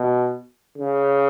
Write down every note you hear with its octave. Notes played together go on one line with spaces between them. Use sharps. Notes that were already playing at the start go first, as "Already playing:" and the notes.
Already playing: B2
C#3